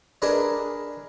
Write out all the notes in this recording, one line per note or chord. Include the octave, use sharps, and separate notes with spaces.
D4 G#4 A#4 B4 D5 D#5